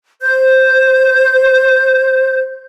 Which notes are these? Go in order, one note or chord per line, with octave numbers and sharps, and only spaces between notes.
C5 G6